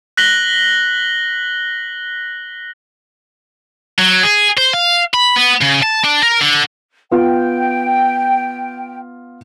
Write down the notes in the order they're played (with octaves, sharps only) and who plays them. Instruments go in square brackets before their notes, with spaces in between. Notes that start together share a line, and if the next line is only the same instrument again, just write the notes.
[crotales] F#6 A#6 B6 F#7 G7
[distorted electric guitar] F#3
G#4
C5
F5
B5
B3
C#3
A5
D4
A#4
D3
[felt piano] B3 F4 [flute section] G5